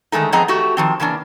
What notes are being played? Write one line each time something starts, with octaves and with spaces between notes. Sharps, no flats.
D3 D#3 G#3 A3 D#4
F3 B3 C4 G#4 D#5 A#5
A3 F#4 G4
D#3 F3 C4
C#3 E3 A#3 D4